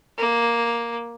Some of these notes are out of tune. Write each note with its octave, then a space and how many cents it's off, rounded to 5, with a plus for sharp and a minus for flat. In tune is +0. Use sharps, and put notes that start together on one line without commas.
A#3 +5